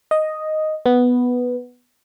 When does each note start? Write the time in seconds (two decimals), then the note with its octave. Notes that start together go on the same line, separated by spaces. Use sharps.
0.11 D#5
0.86 B3